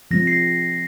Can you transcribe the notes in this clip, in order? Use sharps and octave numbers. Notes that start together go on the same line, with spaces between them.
F3 G#3 C4 A#6
C7
A#6